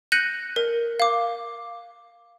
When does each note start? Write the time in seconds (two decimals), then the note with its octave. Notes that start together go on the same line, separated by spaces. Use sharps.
0.12 F#6 G6 A#6 C#7 D#7 F#7
0.56 A#4
1.00 F5 D6